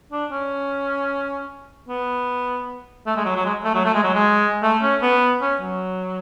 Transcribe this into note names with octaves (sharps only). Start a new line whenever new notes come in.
D4
C#4
B3
A3
G#3
F#3
F#3
G#3
A3
F#3
A3
G#3
F#3
G#3
A3
C#4
B3
C#4
F#3